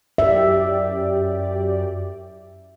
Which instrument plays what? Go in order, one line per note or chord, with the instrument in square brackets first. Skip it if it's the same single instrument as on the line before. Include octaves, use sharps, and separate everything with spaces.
[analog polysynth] F#2 G4 D5 [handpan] E5